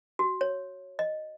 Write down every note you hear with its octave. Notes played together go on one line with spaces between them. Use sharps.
F#4
C#5
D#5